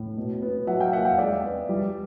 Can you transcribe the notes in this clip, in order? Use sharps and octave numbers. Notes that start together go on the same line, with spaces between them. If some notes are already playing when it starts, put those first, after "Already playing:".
Already playing: A2
B2
B3
F#3 E5 F#5
F5 G5
A#3 E5 F#5
F5 G5
G#3 D5 E5
B3
G3